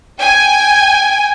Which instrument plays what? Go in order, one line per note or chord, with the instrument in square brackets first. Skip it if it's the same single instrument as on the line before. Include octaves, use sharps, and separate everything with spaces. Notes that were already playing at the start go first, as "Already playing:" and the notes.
[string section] G5 G#5